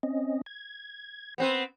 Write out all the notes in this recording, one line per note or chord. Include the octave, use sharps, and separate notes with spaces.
C4 C#4 D#5
G#6
B3 C4 B4